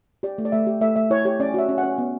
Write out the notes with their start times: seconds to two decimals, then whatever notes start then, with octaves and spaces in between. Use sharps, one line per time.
0.23 G4 D5
0.38 A3
0.45 D5
0.52 A3 E5
0.67 G4
0.81 A3 E5
0.96 A3 E5
1.10 E4 C#5
1.25 G4 C#5
1.40 C#4 D5
1.54 F#4 E5
1.69 C#4
1.78 F#5
1.83 C#4
1.98 B3